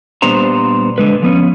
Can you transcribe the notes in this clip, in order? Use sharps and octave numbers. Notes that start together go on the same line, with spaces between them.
A#2 G3 B3 D4 C5 A#5
D3 G#3 B4
F3 B3 C#4